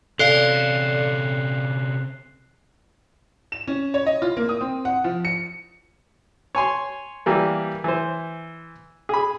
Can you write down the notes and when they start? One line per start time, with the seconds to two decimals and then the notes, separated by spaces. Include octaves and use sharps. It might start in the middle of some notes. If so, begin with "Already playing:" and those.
0.19 C3 C#4 A4 D5 F5 F#6 C7 G7
3.52 E7
3.67 C#4
3.94 C#5
4.06 D#5
4.22 F4
4.37 A#3
4.49 D#6
4.61 C4
4.85 F#5
5.04 F3
5.25 C#7
6.55 C#5 G#5 C6
7.26 E3 G3 A#3
7.84 E3 C5
9.09 G#4 B5